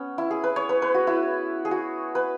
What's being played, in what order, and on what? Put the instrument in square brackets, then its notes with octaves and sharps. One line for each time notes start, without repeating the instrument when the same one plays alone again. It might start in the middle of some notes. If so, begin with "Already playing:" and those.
Already playing: [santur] B3 C#4
E4
G#4
B4
C#5
B4
B4
F#4
E4
G#4
F#4
B4